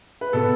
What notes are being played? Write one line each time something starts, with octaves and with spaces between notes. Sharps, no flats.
B4
B2 B3 A4